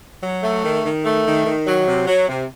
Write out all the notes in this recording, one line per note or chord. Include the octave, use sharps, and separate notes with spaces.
F#3
A3
D#3
D#3
A3
D#3
D#3
F#3
C3
F#3
C3